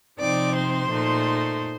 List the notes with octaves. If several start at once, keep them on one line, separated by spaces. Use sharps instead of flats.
C3 F3 C4 D#4 D5 D6
C5 C6
A#2 A3 D#4